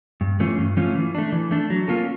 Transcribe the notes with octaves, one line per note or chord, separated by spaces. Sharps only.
G2
E3 A3 C#4 F4
G2
E3 A3 C#4 F4
E3
A3 D4
E3
A3 D4
F#3
A#3 C#4 F4 A4